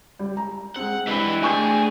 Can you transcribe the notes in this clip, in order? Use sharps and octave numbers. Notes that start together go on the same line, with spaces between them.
G3
A#5
G#3 C4 F#5
E3 D4 G4 D#5 B5
D3 A3 G#4 G5 C#6 G6